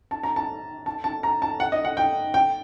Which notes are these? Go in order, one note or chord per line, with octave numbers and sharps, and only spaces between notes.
A5
A#5
A5
A5
A5
A#5
A5
F#5
D#5
F#5
G5
G5